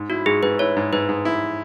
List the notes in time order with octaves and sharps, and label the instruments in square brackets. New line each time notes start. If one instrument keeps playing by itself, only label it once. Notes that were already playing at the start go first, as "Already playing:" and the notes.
Already playing: [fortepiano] G#2
[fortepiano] E4 [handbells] F#4
[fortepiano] G#2 [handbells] G#4
[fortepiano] G#2 [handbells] B4
[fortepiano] E4 [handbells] C#5
[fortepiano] G#2
[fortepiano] G#2 [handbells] B4
[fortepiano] G#2
E4